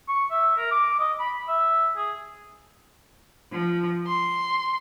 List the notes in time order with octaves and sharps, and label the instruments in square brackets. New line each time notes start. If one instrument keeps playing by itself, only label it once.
[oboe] C#6
E5
A#4
D6
D#5
B5
E5
G#4
[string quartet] F3
C6